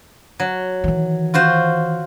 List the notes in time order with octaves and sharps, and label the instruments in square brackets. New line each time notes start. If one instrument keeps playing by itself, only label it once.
[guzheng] F#3
[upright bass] D#3 E3
[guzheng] F4 F#4 C5